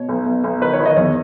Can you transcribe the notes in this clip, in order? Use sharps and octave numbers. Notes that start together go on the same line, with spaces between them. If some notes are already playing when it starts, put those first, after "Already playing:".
Already playing: B2 C#5
B1
B1
B1
D#3 B4
C#5
D#3
D#5
E2 C#5